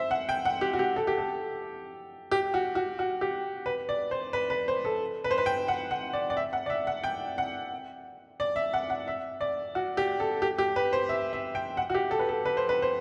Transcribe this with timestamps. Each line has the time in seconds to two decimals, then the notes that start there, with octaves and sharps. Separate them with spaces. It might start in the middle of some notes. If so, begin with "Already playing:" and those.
Already playing: C5 E5
0.11 F#5
0.29 G5
0.45 F#5
0.61 G4
0.73 F#4
0.79 G4
0.96 A4
1.07 G4
1.18 A4
2.31 G4
2.54 F#4
2.75 F#4
2.99 F#4
3.21 G4
3.66 B4
3.89 D5
4.11 C5
4.33 B4
4.50 B4
4.68 C5
4.85 A4
5.24 B4
5.31 C5
5.38 B4
5.46 G5
5.68 F#5
5.91 F#5
6.13 D5
6.30 D5
6.37 E5
6.53 F#5
6.66 D5
6.70 E5
6.87 F#5
7.04 G5
7.38 F#5
8.40 D5
8.56 E5
8.73 F#5
8.90 F#5
9.08 E5
9.41 D5
9.75 F#4
9.97 G4
10.20 A4
10.42 G4
10.58 G4
10.76 B4
10.93 C5
11.09 E5
11.33 E5
11.55 G5
11.77 F#5
11.90 F#4
11.94 G4
12.11 A4
12.19 B4
12.29 A4
12.45 B4
12.57 C5
12.69 B4
12.82 C5